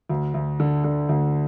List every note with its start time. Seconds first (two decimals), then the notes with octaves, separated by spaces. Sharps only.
0.09 D2
0.34 D2
0.60 D3
0.84 D3
1.09 D2